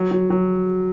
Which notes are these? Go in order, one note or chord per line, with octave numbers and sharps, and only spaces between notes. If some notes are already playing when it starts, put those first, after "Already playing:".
Already playing: F#3
F#3
F#3